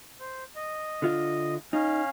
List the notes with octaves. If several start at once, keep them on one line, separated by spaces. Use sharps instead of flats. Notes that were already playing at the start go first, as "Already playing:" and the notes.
C5
D#5
D3 F4 E5
C#4 D#4 F5